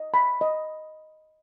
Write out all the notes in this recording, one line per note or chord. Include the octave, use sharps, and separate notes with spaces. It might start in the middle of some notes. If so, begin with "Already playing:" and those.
Already playing: D#5
B5
D#5